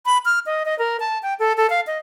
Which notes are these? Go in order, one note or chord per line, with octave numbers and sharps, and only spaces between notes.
B5
F6
D#5
D#5
A#4
A5
G5
A4
A4
F5
D#5